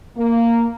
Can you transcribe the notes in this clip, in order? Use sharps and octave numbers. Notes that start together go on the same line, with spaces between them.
A#3